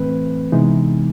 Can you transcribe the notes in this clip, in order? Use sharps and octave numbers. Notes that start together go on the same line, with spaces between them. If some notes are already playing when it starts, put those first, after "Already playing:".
Already playing: A2 E3 A3 C4 B4
C3 E3 G#3 B3 D#4